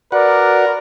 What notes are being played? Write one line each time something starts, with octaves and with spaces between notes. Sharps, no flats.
F#4 A#4 B4 D5 F#5